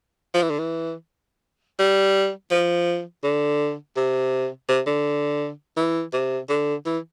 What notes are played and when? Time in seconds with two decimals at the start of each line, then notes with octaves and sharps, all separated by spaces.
0.35 F3
0.42 E3
0.50 D3
0.59 E3
1.79 G3
2.51 F3
3.24 D3
3.97 C3
4.69 C3
4.87 D3
5.77 E3
6.13 C3
6.49 D3
6.86 E3